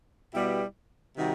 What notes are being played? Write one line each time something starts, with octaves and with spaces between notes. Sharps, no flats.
B2 G3 B3 E4 G4
C3 D#3 G3 D#4 F#4